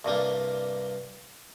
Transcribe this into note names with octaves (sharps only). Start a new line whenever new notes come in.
C2 G2 G3 A#3